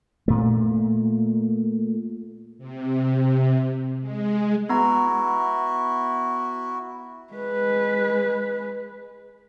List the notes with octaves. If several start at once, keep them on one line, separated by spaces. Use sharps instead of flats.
A#2 A3
C3
G#3
B3 E4 F#4 A#5
G#3 B4